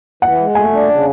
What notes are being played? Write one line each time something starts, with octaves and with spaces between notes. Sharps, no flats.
E3 F#5
G#3
A3 G#5
D4
C#3